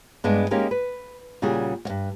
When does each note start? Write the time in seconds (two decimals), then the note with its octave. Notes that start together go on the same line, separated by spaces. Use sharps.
0.24 G2 G#3 B3 D4
0.51 G#3 A#3 C#4 D#4 G4 G#4
0.71 B4
1.42 A#2 C#3 G3 F#4 G#4
1.85 D2 G2